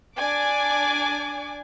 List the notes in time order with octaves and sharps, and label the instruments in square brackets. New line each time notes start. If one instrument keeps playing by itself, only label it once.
[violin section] D4 D5 G#5 D6